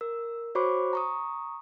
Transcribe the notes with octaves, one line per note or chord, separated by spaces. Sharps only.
A#4 E6
F#4 C5 C#5 B5 C#6 D6
A#5 C#6 D#6